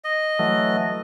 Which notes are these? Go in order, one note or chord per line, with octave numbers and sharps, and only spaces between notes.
D#5
E3 F#3 A3